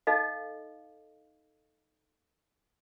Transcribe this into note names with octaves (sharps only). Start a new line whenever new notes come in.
D#4 A4 D#5 F5